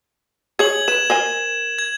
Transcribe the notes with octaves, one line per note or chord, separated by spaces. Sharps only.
G#4 C#5 G#6 F#7
B4 E7
A#4 C5 G#5
G#6